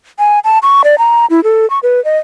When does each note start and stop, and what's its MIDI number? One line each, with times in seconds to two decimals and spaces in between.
0.19 0.39 80
0.44 0.59 81
0.63 0.82 85
0.84 0.96 74
0.98 1.26 82
1.30 1.43 64
1.44 1.68 69
1.70 1.79 85
1.83 2.03 71
2.05 2.18 75